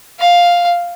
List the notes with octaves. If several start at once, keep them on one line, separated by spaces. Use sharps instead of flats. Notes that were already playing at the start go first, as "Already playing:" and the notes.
F5